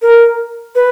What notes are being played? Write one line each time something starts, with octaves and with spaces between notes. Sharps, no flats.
A#4
B4